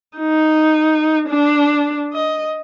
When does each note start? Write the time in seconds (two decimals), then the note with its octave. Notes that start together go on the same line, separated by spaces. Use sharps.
0.18 D#4
1.29 D4
2.14 D#5